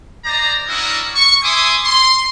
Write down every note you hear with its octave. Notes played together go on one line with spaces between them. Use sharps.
C5 D5 D#5 A#5
C#4 D4 E4 F#4 A#4 D#5
C#6
E5 G#5 C6 D6 D#6
C6